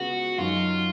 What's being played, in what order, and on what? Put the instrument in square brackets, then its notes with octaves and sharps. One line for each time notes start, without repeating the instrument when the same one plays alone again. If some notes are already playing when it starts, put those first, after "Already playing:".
Already playing: [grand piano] C#3 G#3 B3 F4 [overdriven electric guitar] F#4
[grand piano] F#2 D#3 F#3 [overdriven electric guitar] F4